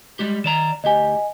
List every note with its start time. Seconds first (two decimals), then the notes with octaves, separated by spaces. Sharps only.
0.19 G3 G#3 G4
0.44 D#3 D5 A#5 E7
0.84 D2 G4 D#5 G#5